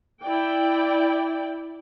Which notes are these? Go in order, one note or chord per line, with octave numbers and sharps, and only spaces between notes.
E4 D5 G5